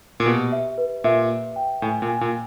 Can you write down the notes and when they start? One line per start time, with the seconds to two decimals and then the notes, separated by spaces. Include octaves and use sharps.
0.20 A#2
0.26 B2 G4
0.52 E5
0.78 B4
1.04 A#2 E5
1.30 E5
1.56 G5
1.82 A2 G#5
2.02 A#2
2.08 G#5
2.21 A#2